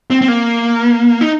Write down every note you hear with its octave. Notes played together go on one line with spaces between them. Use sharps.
C4
C4
A#3
D#4